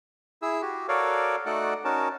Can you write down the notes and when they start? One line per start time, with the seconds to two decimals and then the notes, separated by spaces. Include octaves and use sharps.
0.42 E4 G#4 E6
0.62 F#4 G4
0.88 F#4 A4 A#4 C#5 D5 F5
1.46 A3 D#4 F#4 A4 D5 F#5
1.84 C#4 D#4 F#4 A#4 A5